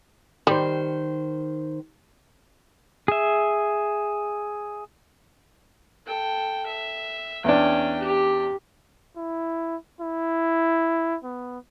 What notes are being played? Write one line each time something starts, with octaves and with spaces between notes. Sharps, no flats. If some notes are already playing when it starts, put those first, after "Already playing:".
D#3 G3 C5
G#4 E5
A4 G5
E5
E2 C#4 D4 G5
G4
E4
E4
B3